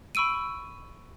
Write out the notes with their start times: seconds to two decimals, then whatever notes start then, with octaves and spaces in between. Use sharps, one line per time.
0.15 B5 C#6 E6 D7 D#7